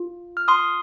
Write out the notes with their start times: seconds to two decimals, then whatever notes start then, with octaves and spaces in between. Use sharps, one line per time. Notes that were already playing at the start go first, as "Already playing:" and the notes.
Already playing: F4
0.37 F6
0.48 C6 D#6